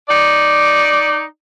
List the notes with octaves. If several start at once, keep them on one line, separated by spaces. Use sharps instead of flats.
D#4 D5